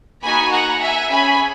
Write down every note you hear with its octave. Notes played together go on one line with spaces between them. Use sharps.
A#3 D#4 F#4 G#5 B5
F#5 A#5
E5 G#5
C#4 G#4 G#5 B5